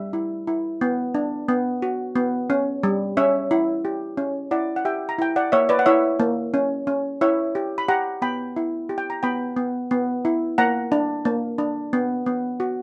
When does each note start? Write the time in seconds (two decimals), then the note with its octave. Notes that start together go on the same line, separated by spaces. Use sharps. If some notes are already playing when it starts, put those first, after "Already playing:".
Already playing: G3 E5
0.13 E4
0.47 E4
0.81 B3
1.15 D4
1.49 B3
1.82 F#4
2.16 B3
2.50 C#4
2.83 G3
3.17 C#4 C#5 E5
3.51 E4
3.85 G4
4.17 C#4
4.51 E4 D5 F#5
4.76 F#5
4.85 G4 E5 G5
5.09 A#5
5.19 E4 G5
5.36 D5 F#5
5.52 A#3 C#5 E5
5.69 B4 D5
5.79 F#5
5.86 E4 C#5 E5
6.20 A#3
6.54 C#4
6.87 C#4
7.21 E4 C#5 E5
7.55 G4
7.78 B5
7.88 G4 F#5 A#5
8.22 B3 G5 B5
8.56 E4
8.89 G4
8.98 G5
9.10 A#5
9.23 B3 G5 B5
9.57 B3
9.91 B3
10.25 E4
10.58 A#3 F#5 A#5
10.92 D4
11.25 A#3
11.58 D4
11.93 B3
12.26 B3
12.60 F#4